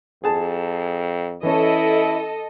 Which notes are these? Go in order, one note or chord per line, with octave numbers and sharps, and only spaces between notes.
F2 G#4 A5
E3 C#4 E4 A4 D#5